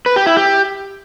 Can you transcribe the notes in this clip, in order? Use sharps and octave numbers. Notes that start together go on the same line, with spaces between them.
B4
G4
E4
G4